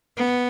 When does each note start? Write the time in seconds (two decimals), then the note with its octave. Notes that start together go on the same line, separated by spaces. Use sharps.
0.17 B3